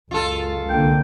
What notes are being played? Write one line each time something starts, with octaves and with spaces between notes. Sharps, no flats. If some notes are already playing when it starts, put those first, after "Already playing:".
C#2 F#2 F4 A4
C2 D3 A#3 G5